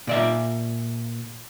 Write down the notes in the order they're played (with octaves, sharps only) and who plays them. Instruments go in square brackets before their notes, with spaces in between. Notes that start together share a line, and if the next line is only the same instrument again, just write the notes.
[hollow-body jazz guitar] A#2 D5 E5